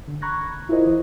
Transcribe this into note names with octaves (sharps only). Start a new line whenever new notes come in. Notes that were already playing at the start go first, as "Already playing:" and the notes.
D3
A#5 B5 C#6 F#6 G#6 A#6
E4 F4 G#4 A#4 C5 D#5
E3 D#5